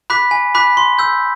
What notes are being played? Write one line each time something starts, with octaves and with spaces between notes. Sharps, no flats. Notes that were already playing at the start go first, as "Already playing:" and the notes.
B5 D6 F#6 B6
G#5
B5 D6 F#6 B6
C6
E6 G6